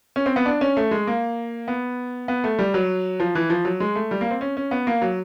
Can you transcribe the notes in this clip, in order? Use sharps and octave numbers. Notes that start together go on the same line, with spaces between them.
C#4
C4
B3
D4
C#4
A3
G#3
A#3
B3
B3
A3
G3
F#3
F3
E3
F3
F#3
G#3
A3
G3
A#3
C4
C#4
C#4
B3
A#3
F#3